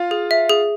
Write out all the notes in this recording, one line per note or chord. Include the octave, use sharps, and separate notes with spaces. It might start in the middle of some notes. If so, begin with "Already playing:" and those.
Already playing: F4 F5
G#4
E5
G#4